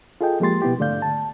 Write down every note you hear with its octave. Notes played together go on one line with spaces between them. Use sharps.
F4 G#4 A4 D#5 G5
F3 G#3 A#3 G4 C6 A6
B2 B3 E4 G4
G#2 D3 A3 D5 F5 G6
A5